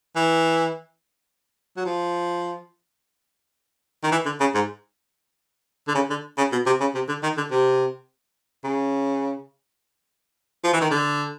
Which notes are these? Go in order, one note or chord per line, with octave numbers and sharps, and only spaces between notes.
E3
F#3
F3
D#3
E3
D3
C#3
G#2
D3
C#3
D3
C#3
B2
C3
C#3
C3
D3
D#3
D3
C3
C#3
F3
E3
D#3
D3